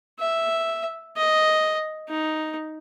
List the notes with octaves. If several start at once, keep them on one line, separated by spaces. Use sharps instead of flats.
E5
D#5
D#4